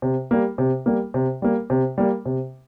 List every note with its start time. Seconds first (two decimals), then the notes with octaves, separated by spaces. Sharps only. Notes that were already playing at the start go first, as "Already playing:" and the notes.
0.02 C3
0.31 G3 A#3
0.58 C3
0.86 G3 A#3
1.14 C3
1.42 G3 A#3
1.70 C3
1.98 G3 A#3
2.26 C3